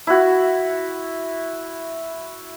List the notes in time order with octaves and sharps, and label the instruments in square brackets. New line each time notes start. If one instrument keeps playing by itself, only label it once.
[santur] E4 F#4